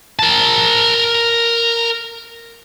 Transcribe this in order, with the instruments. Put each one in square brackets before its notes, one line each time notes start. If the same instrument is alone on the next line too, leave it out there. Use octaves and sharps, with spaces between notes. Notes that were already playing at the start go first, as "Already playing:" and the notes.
[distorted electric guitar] A#4 A5